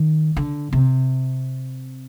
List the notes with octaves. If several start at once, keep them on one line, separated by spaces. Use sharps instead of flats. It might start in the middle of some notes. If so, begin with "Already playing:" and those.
Already playing: D#3
D3
C3